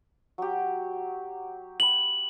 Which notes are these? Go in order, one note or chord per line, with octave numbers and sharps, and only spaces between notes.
F#3 G4
G5 B5 F#7